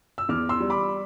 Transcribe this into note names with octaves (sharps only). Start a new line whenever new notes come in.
E6
E2 D6 F6
C6 E6
G3
B5 D6